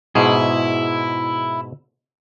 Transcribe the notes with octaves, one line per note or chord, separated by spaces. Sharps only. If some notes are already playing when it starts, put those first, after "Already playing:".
G#2 B2 E4 G#4